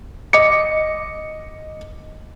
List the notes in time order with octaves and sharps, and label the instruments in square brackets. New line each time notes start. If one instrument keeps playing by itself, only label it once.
[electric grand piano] D#5 D6 C#7